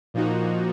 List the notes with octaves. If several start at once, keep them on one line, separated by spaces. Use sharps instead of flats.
A#2 F3 A#3 D#4 F#4